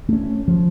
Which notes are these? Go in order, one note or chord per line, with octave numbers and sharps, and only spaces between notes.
A3 C#4
F3